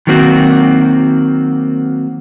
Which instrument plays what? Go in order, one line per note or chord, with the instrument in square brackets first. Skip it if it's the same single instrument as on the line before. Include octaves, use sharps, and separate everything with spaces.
[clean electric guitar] D#3 F#3 A#3 C4 F#4